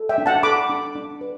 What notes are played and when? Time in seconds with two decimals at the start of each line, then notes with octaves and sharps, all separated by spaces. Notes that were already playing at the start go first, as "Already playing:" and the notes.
Already playing: A4
0.09 E5 G5
0.18 D4
0.26 F#5 A5
0.43 A4 B5 D6
0.69 D4
0.95 D4
1.21 B4